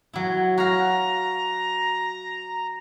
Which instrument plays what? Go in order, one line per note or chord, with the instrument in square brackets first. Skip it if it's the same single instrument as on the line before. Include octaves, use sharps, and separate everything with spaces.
[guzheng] F#3 E4
[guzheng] F#4 F5 [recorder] A#5